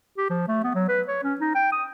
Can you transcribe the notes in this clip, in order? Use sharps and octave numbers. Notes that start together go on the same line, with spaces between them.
G4
F3
A3
B3
F#3
B4
C#5
C#4
D#4
G5
D#6